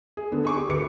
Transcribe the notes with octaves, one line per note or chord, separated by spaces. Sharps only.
G#4
D3 B3
G#4 C#6 D6
G4
D2 B4 D6 C#7